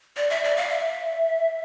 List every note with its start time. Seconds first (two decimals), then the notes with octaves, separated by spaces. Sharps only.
0.17 D5
0.30 E5
0.44 D5
0.56 F5
0.69 E5